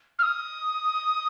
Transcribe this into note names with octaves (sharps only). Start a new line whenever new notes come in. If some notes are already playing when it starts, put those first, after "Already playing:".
F6
D#6